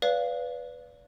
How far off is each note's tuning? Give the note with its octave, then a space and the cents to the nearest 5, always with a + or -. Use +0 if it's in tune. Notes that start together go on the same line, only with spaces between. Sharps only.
B4 +0 D5 -30 F5 +0